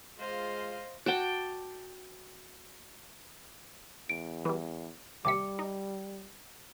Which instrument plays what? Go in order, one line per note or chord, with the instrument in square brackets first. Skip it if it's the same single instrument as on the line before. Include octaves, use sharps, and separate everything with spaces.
[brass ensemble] G#3 F4 [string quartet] C5 D#5 F5
[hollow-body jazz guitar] F#4 F#5 [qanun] G5 A5 D6
[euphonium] E2 [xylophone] D7
[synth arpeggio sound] E3 G3
[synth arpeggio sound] D#2 C3 E5 [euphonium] G3 [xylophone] D6 C#7
[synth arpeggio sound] D#4